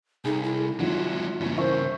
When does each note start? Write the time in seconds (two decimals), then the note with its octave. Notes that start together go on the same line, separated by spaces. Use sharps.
0.25 C2 D#4 G#4 A4
0.43 E4
0.80 G#1 D#3 F#3 E4 F4
1.40 E2 G2 A#2 C#3
1.57 E3 A#4 C5 E5 C#6